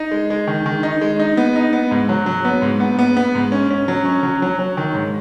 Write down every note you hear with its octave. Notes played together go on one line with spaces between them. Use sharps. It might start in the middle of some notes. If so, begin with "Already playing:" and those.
Already playing: D#4
G#3
G#3
D#3
D#3
D#4
G#3
D#4
B3
D#4
B3
G#2
F#3
F#3
B3
G#2
B3
B3
B3
G#2
C#4
C#4
F#3
C#4
F#3
F#3
F#3
D#3
G#2